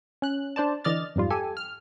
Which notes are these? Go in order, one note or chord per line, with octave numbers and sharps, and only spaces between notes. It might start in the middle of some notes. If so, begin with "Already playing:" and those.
C#4 F#6
D4 C5 D5 A5
D3 E3 D5 D#5 F6 A6
F2 G#2 G3 F4
G4 A4 G#5
F6